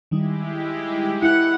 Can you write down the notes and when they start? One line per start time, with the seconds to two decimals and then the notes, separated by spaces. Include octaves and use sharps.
0.11 D#3 G3 G#3 D#4 E4 G4
1.22 E4 F#5 C#7